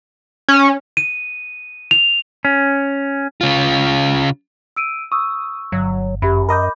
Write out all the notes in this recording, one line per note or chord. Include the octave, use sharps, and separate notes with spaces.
C#4
D#7
F7
C#4
C#3 F4
E6 D7 D#7
C#6 D#6 E6
G1 F#3
F#2 G4 E5 B5
A#4 D#5 B5 D6 G6